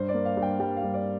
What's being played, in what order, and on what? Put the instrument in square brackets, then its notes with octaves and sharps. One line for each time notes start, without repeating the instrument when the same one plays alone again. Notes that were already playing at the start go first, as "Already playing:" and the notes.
Already playing: [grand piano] G2 C5
D5
A#3
F5
G2
G5
G3 G5
F5
G2
D5